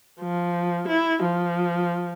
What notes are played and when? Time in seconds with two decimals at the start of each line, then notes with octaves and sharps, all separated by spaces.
0.20 F3
0.88 E4
1.23 F3